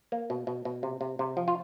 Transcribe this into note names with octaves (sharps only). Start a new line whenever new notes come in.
A#3
B2
B2
B2
C3
C3
C3
F3
F4